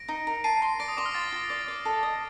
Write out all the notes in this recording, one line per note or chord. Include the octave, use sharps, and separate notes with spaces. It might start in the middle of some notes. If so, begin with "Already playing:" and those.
Already playing: A#6 D7
D#4
A#4
A5 C7 D#7
C6
D5 A#6 D7
D#6
C6 D6
F6
F4 A6
F4
D5
D5
A4
D#5